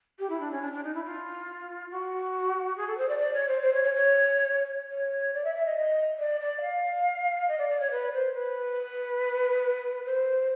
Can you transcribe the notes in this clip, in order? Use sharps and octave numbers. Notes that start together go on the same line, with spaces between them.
G4
E4
D4
C#4
D4
D4
D#4
E4
F4
F#4
G#4
A4
C5
D5
D5
C#5
C5
C5
C#5
C#5
C#5
C#5
D5
E5
E5
D#5
D#5
D5
D5
F5
D#5
D5
D5
C#5
B4
C5
B4
C5